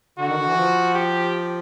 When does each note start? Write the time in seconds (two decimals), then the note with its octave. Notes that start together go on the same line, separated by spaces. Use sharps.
0.19 D3 F#4
0.27 D#3
0.37 D3
0.46 E3
0.57 F3
0.95 G4